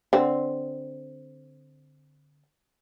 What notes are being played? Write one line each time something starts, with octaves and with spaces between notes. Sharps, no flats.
D3 C4